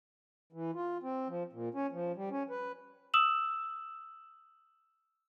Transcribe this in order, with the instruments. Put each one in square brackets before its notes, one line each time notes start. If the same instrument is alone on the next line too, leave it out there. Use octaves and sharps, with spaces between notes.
[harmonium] E3
F4
C4
F3
A#2
C#4
F3
G3
C#4
B4
[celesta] D#6 E6 E7 F#7